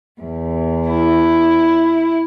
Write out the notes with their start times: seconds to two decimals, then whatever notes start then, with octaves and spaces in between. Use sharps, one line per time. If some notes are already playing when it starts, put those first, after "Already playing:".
0.21 E2
0.90 E4